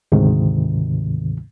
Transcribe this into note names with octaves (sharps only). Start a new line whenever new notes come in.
D2 G#2 C3 D#3